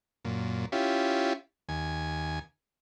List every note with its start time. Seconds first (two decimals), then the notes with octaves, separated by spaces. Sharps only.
0.25 F#2 A#2
0.72 C#4 E4 F4 G4
1.69 D#2 G#5